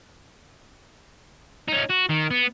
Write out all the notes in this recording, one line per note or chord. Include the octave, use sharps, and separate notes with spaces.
C#4 D#4
F#4
D#3
B3